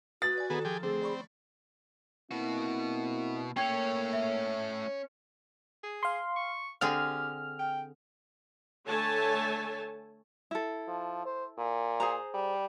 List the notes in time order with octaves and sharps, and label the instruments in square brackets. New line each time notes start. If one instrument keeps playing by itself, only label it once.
[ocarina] F#4 [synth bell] B4 D#6 [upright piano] A6
[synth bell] D5 G#5
[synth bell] D#3 A4 A#5 [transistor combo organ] B3 G#4
[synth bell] F3 [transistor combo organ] G4 G#4
[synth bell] D3 A3 [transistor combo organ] C4 [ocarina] G#4
[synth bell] D5 B5 C#6
[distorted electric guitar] B2 F#4 [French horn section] A#3 C4 E4
[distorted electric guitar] A3 C#5 [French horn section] A#3 [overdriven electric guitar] C#4 [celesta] G5 G#6
[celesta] E5
[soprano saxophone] G#4
[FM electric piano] F5 C6
[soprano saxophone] C#6
[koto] D3 C4 G#4 [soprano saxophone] G4 [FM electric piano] F6
[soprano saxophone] G5
[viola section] D3 A3 A4 C#5 G#5 A5
[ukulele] E4 A4
[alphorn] F3
C5
A#2
[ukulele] G#4 C5 A#5
[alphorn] G3